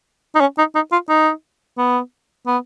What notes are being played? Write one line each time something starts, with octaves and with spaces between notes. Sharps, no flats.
D#4
C#4
D#4
D#4
F4
D#4
B3
B3